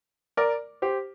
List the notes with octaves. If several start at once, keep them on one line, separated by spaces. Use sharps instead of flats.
A#4 D5
G4 C5